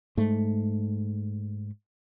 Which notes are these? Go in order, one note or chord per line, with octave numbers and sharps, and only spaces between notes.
G#2 A3